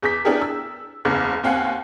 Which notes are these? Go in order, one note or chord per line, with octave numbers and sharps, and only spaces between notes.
E2 G#4 D6 G6 B6
B3 D4 E4 G4 G#4 A#4
E6
F#1 E2 C#3
D#2 C4 F5 F#5 G#5